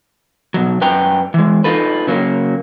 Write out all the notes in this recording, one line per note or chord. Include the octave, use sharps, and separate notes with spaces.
B2 F#3
F#2 B4 G5 A#5
E3 G#3
D#4 F4 A4 B4
C#3 F#3 A#3